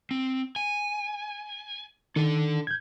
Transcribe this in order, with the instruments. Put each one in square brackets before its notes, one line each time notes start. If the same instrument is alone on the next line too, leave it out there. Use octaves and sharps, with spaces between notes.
[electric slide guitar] C4
G#5
[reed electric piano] D#3 [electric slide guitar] D4 A4
[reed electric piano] G6 G#6